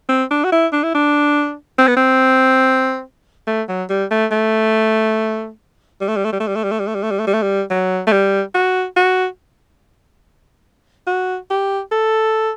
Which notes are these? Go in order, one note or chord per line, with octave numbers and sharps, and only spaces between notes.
C4
D4
F#4
E4
D4
E4
D4
C4
B3
C4
A3
F#3
G3
A3
A3
G3
A3
G3
A3
G3
A3
G3
A3
G3
A3
G3
A3
G3
A3
G3
A3
G3
A3
G3
F#3
A3
G3
F#4
F#4
F#4
G4
A4